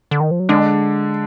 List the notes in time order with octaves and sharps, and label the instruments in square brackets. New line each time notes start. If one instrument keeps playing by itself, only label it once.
[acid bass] D3
D#3
F3
F#3
[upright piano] D3 D4 [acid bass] G#3